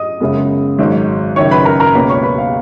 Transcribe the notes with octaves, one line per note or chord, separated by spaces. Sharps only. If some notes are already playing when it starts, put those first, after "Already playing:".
Already playing: D#5 D#6
F#1 F#2 C#3 G#3 B3
G#1 G#2 F#3
F#1 F#2 D#3 C#5 C#6
B4 B5
A#4 A#5
A#4 A#5
C#2 B2 A#3 C#4 B4 B5
C#5 C#6
B4 B5
F5